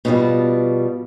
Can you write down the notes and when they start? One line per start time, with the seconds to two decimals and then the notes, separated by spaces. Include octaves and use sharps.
0.05 B2 F3 G3